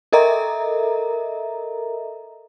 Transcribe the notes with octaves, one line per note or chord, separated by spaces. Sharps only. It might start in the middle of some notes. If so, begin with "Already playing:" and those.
A4 A#4 D#5 E5 A#5